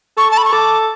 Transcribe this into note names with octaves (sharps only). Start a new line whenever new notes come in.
A4 C#6
A5
B5
C#6
A4 D6